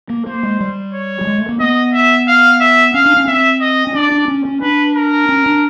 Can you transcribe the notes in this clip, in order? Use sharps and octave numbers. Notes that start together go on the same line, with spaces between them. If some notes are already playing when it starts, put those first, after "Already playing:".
A#3
A#3 C5
G#3
G3
C#5
G3
G#3
A3
A#3
B3 D#5
E5
F5
E5
C#4 F5
D4
C#4
C4 E5
D#5
C#4
D4 D5
D4
C#4
C#4
D4 B4
A#4
C#4
D4